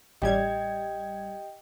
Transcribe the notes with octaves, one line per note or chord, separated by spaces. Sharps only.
A1 G3 G4 D#5 G5 G#6